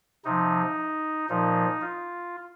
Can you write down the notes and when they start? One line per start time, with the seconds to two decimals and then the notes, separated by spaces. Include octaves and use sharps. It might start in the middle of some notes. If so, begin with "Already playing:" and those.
0.25 C3 F3 D#4
1.29 A#2 F3 D#4
1.81 F4